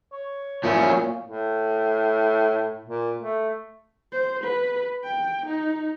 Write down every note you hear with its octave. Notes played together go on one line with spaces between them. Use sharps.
C#5
A#2 F3 F#3 C#4 E4
A2
A#2
A3
C5
B4
G5
D#4